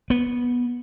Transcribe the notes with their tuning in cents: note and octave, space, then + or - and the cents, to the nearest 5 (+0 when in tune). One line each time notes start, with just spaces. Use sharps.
B3 -15